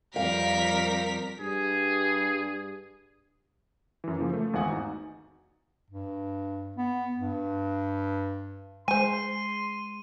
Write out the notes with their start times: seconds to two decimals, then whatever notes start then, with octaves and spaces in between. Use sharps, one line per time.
0.16 F2 G3 A#4 F5 B6
1.39 G2 G#4
4.04 F#2 E3
4.19 C#3 F3 A#3
4.34 A3
4.53 G#1 E2 F5 F#5 G#5 D#6
4.70 D#4 F#4
5.90 G2
6.77 B3
7.18 G2
8.88 G#3 C5 G#5 C6 D#7